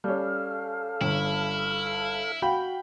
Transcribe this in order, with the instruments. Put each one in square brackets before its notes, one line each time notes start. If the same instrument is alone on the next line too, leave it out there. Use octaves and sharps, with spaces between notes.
[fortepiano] G3 C#4 [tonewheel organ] A4 F5
[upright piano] G1 [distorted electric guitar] E4
[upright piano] F#4 [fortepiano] F5 G5 B5